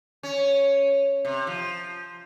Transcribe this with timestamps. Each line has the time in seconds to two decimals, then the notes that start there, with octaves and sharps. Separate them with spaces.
0.23 C#4
1.25 C3
1.47 F3